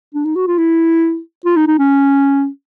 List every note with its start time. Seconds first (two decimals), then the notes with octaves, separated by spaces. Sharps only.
0.15 D4
0.25 D#4
0.36 F#4
0.47 F4
0.58 E4
1.46 F4
1.57 D#4
1.67 D#4
1.79 C#4